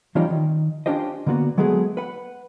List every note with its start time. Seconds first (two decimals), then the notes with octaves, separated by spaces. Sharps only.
0.15 E3 F3 G3 C#4 D#4 F4
0.30 D#3
0.86 C#4 D4 F4 G4 C5 D#5
1.27 D3 A#3 B3 F#4
1.58 F#3 G#3 A3 B3 G#4
1.97 B4 F#5